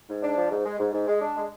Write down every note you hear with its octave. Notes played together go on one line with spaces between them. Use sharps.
G#2
D4
F3
G#2
G#3
G#2
G#2
G#3
D4
G#3